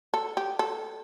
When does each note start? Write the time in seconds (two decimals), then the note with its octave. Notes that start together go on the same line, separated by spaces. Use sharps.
0.14 A4
0.37 G4
0.59 A4